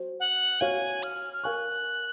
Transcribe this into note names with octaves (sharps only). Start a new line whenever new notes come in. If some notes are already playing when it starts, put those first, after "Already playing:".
Already playing: F#4 C5
F#5
F#4 C#5 F5 G#5
F6
F6
A#4 F5 G#5 C#6 F#6